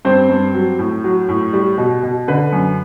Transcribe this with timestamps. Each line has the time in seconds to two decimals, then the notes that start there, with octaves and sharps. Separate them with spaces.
0.05 G2 C4 C5
0.29 G2
0.54 F#3
0.79 A2
1.04 F#3
1.29 A2
1.53 G3
1.78 B2
2.03 B2
2.28 D3 B4
2.53 F#2